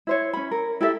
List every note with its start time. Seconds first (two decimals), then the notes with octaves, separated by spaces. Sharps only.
0.07 E4 C5 C#5
0.33 C#4 B5
0.51 A#4
0.81 E4 G4 A4 E5